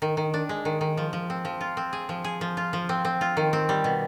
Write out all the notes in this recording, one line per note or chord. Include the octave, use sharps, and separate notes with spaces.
D#3
D#3
D4
G#3
D#3
D#3
F3
F3
C4
F3
F4
C4
G#4
F3
G#4
F3
F4
F3
C4
C4
F4
D#3
C4
G3
B2